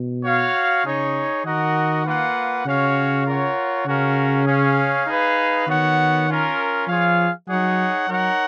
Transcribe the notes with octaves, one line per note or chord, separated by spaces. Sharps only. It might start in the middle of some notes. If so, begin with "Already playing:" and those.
Already playing: B2
F#4 C#5 F5
C#3 D#4 G#4 C#5
D#3 F#4 A#4 D#5 F#5
A#3 F4 B4 F#5
C#3 C#4 F#4 C#5 F5
F4 A#4 C#5 F#5
C#3 C#4 F#4 A#4 F5
C#4 G#4 C#5 F5
D#4 G#4 B4 F5
D#3 B3 F#4 C#5 F#5
C#4 F4 A#4
F3 F4 G#4 C#5 F5
F#3 D#4 G#4 C#5 F#5
F#3 D#4 A#4 C#5 F#5